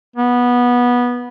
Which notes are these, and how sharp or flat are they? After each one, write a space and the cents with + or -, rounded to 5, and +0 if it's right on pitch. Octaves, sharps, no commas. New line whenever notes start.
B3 -15